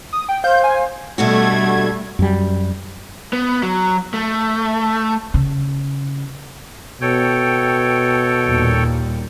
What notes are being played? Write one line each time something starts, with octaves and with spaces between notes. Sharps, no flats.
D#6
G5
C5 F5 G6
G#5
B2 G3 A3 D4 F#4 G#6
F#2 G3
B3
F#3
A3
C#3
B2 A4 C#5 G5
D#2 A#2 G3